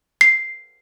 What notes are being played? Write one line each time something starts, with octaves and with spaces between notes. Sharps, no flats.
C7